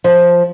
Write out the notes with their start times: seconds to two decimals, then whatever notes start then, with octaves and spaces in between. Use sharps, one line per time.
0.04 F3